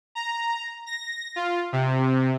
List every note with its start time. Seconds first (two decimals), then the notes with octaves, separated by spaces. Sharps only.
0.15 A#5
0.86 A#6
1.36 F4
1.73 C3